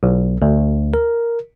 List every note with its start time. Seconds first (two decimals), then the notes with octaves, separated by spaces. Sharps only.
0.03 B1
0.42 D2
0.94 A#4